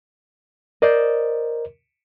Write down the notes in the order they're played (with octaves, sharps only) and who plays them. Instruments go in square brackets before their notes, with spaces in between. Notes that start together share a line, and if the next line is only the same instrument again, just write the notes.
[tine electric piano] A#4 [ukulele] C5 D5 D#5